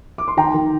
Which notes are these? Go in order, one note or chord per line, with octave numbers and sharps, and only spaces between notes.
D6
C6
D#3 G5 A#5
D#3